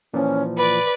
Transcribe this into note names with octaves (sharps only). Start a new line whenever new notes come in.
A#2 E3 F3 C#4
B4 D5 B5